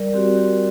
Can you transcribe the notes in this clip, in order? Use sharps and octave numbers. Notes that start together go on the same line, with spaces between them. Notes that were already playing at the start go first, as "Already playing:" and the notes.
Already playing: G3 A#4 D5
C4 F#4 G4 A#4
G4 A#4